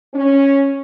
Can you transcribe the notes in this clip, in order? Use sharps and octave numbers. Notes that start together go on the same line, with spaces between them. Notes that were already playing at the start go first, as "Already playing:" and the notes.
C#4